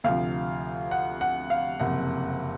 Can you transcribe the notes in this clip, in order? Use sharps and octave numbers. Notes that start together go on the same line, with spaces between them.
D2 C3 F3 F5
F#5
F#5
F5
F#1 F2 C3 F#5